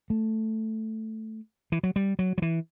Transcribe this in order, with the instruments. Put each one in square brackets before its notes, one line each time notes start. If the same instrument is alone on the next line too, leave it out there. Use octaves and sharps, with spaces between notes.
[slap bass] A3
E3
F#3
G3
F#3
F#3
E3